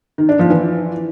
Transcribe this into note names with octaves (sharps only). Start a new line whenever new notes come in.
D#3
D4
F3
E3